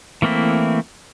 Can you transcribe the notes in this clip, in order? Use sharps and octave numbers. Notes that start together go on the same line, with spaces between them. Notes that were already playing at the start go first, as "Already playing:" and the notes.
E3 A3 A#3 C4 E4